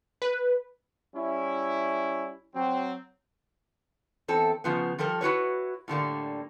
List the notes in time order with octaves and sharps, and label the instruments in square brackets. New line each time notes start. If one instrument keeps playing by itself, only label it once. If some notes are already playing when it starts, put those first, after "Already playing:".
[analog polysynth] B4
[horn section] G3 C#4 E4
F#3 C4
[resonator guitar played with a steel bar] E2 C4 A4
C#3 F3 B3
F3 G3 A4 A#4
E4 F#4 B4 C#5
A2 D3 G3 A#3